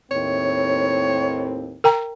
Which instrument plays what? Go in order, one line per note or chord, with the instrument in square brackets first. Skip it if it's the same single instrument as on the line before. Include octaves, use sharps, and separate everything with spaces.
[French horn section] D#2 A2 C4 [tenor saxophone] C#5
[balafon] A#4 G5 A#5